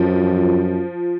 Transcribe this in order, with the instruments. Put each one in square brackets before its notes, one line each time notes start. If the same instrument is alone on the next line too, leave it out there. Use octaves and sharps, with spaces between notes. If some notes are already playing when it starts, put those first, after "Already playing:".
Already playing: [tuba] F#2 [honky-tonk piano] F3